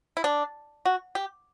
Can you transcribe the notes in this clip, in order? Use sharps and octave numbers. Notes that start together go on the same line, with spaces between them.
E4
D4
F#4
G4